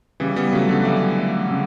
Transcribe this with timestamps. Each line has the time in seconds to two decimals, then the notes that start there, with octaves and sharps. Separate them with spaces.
0.20 C#3 E3 G3
0.36 G3 B3
0.53 C#3 F#3 A3
0.69 D3 F#3
0.85 E3 G3 A3
1.18 A3
1.50 C#3